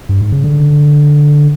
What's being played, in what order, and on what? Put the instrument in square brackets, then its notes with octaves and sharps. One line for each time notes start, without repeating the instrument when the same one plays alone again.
[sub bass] G2
G#2
C#3
D3